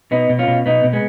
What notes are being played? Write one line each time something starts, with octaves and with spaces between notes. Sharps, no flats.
B2 B3 D#4
B2
C#4 F4
B2
B2 B3 D#4
B2
G#3 B3